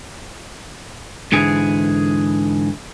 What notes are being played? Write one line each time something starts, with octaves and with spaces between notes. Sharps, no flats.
G#2 D3 E3 G#4